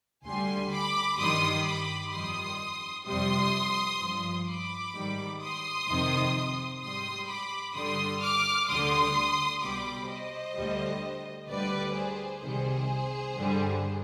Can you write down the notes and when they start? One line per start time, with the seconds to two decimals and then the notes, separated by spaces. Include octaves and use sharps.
0.25 D2 D3 G3 G#5 C6
0.72 B5 D6
1.19 G2 D#3 G3 C6 D#6
1.65 B5 D6
2.12 F2 D#3 G3 C6 D#6
3.06 F2 C3 G3 C6 D#6
4.00 G2 F3
4.47 B5 D6
4.93 G#2 D#3 G3
5.40 C6 D#6
5.87 F2 C3 D#3
6.81 G#2 G3 C6 D#6
7.27 B5 D6
7.74 G2 D3 G3 C6 D#6
8.21 D6 F6
8.68 D2 D3 G3 C6 D#6
9.61 C2 B2 G3 B5 D6
10.08 C5 D#5
10.55 D2 D3 G3
11.48 D2 D3 G3 B4 D5
11.95 G#4 C5
12.42 C2 C3 D#3 G3 G#4 C5
13.36 G2 D3 G3